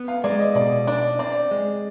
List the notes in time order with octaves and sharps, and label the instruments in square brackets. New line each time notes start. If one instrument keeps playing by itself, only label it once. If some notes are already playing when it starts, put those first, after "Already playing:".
Already playing: [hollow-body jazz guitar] B3
[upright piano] F5
[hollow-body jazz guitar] G#3 [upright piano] D5
[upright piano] D#5
[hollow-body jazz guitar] B2 [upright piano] D5
[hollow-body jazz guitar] D4 [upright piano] D5
[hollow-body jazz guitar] C4 [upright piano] D5
[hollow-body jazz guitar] G#3